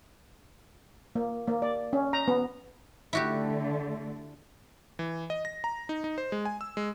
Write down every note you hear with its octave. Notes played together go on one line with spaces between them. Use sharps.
A#3
A#3
D5
C#4
A#5
B3
D3 A3 E4 F#4 G4
E3
D#5
A#6
A#5
D#4
D#4
C5
G#3
G#5
E6
G#3